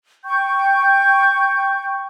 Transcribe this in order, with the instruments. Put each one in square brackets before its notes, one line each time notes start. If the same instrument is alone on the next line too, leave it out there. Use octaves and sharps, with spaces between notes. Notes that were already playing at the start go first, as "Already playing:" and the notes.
[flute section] G5 C#6 G6